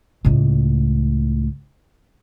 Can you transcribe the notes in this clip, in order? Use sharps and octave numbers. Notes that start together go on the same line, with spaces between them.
C#2 A2